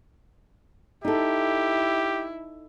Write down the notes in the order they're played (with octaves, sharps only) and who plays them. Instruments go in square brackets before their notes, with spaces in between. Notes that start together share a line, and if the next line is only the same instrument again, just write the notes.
[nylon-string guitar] D#4 A4 [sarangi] E4 [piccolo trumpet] G4